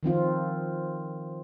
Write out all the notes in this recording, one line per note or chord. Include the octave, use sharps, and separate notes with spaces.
D#3 F3 C4 F4